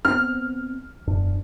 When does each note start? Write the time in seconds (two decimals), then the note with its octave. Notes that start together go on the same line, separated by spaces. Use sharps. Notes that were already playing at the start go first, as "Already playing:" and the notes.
0.05 B3 C4 F6
1.07 E1 F#2 D4